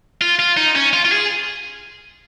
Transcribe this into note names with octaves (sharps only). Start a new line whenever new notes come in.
F4
F4
D#4
C#4
F4
F4
G#4